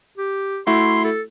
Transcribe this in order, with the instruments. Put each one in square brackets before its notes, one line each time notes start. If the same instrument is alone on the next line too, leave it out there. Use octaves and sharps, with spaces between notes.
[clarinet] G4
[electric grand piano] A3 E4 F#4 [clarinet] C6
[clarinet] A4